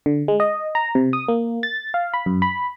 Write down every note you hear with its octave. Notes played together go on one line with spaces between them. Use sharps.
D3
G#3
D#5
A#5
C3
D#6
A#3
A6
F5
B5
F#2
B5